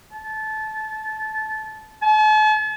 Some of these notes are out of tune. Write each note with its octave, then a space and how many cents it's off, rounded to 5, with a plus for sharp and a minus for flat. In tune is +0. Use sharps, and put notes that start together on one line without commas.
A5 -20
A5 -45